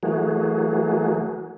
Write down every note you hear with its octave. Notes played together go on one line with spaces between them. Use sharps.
E3 F#3 A3 A#3 F#4 G#4